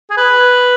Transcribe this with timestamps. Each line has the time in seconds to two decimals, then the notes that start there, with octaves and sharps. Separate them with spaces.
0.10 G#4
0.17 B4